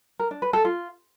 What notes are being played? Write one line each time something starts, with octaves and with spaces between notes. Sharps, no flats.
A#4
D4
B4
A4
F4